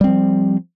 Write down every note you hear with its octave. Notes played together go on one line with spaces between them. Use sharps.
F3 G3 C4